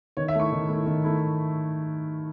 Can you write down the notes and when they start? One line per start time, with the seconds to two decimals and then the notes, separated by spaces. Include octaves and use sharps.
0.17 D#3 C#5
0.28 E5
0.35 A3 E4 C#6
0.52 D#3
0.69 A3 E4
0.86 D#3
1.04 A3 E4